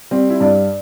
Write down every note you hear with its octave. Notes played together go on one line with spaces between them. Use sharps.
G3 C4
E4
G2 D4